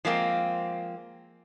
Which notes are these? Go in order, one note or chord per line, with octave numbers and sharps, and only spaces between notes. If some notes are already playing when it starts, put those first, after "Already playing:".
F3 G#3 A#3 C4